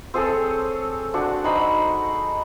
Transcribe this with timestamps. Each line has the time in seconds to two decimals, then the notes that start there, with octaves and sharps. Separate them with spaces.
0.14 C4 G#4 A4 C#5
1.14 D4 F#4 C5
1.44 D#4 C5 B5 C#6